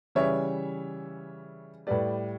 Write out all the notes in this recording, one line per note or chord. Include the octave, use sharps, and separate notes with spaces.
C#3 E3 G3 C#5 E5
A2 G3 B4 D5